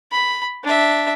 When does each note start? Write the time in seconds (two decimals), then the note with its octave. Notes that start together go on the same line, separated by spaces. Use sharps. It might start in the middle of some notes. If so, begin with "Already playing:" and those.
0.12 B5
0.63 D4 E5